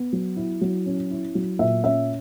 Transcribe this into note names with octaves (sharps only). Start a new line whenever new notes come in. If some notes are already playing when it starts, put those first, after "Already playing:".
Already playing: B3
F#3
E4
F#3
C#4
E4
F#3
A#2 E5
C#4 E5